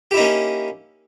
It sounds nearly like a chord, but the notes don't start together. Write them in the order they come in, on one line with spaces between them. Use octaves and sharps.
G4 E4 D#4 A#3 C#4